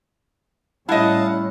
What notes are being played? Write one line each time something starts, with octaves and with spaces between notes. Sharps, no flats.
A2 G3 C#4 E4 D#5 F5 F#5 A5